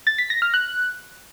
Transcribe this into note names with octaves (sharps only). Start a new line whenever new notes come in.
A6
B6
A#6
F6
F#6